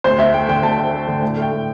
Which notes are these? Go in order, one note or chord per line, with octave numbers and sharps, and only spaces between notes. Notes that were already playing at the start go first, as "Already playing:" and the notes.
D2 C5
D2 E5
A3 G5
D3 G5
D2 A5
D2
A3
D3
A2 G5
A3
G5
A2